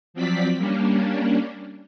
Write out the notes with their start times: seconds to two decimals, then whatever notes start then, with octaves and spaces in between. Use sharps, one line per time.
0.14 F3 F#3 C4 D5 B6
0.57 G3 A#3 C#4 D4